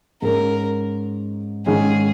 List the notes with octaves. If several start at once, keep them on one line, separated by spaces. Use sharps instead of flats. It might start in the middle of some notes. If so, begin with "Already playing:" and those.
G#2 G#3 C#4 A#4
G#2 D#3 G#3 C#4 G#4